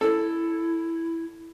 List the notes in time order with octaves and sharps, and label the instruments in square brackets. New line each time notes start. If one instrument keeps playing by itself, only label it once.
[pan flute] E4 [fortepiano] A4